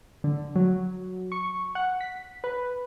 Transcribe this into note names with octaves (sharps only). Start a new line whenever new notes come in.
D3
F#3
C#6
F#5
B6
B4